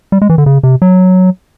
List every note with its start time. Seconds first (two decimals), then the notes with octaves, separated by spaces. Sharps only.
0.12 G3
0.22 G#3
0.29 E3
0.38 D3
0.46 C#3
0.63 C3
0.82 F#3